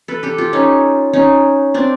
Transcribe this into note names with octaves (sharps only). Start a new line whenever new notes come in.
A4 B4
G4 A4
F4 G4
C#4 D#4
C#4 D#4
C4 D4